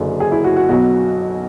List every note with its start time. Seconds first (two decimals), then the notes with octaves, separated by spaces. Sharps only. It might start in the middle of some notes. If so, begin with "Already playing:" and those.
Already playing: F#1 F#2 D3
0.20 G#4
0.32 E4
0.44 F#4
0.56 F#4
0.69 B1 B2 F#3 F#4